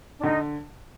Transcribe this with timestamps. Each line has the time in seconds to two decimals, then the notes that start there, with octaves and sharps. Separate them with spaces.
0.19 D4
0.24 D3 D#4